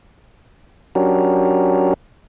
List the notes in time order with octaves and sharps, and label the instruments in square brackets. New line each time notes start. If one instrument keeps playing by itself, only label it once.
[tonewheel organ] F#3 C#4 D4 F#4 G4 A#4